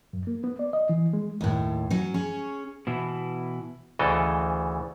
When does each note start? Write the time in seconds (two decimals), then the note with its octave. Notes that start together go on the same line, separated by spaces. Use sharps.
0.13 F#2
0.27 A#3
0.44 B3
0.59 D5
0.73 D#5
0.89 E3
1.13 G#3
1.41 D#2 A2
1.90 F#3 C#4
2.14 C#4 G#4 C#5
2.87 B2 E3 E4
3.99 D2 C#3 E3 A4 D#5